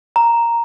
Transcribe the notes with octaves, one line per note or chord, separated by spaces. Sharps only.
A#5